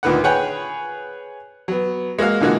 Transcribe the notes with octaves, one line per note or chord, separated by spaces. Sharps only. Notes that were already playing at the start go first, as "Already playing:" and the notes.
D2 A#2 D#3 B4 F#5
G#4 B4 C#5 F#5 G5
F#3 B3
G#3 A#3 F#4 F5
A#2 D3 E3 G#3 A#3 F#4